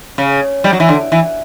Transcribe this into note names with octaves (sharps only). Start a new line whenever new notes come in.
C#3
G3
F#3
E3
D3
E3